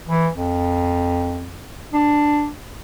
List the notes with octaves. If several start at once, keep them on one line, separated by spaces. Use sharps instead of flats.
E3
F2
D4